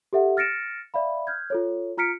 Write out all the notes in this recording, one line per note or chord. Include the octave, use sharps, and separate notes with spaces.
G4 A4 E5 F#5
F6 A6 A#6 C#7 D7 E7
D5 E5 F5 B5
F6 G6 G#6
F4 A4 C#5
F4 A#5 F6 B6 C#7 D7